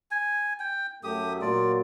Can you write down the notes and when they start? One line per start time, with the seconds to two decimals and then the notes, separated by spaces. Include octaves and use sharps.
0.11 G#5
0.59 G5
1.03 F#2 F#3 A3 G4 D#6
1.41 A#2 F#3 F4 D5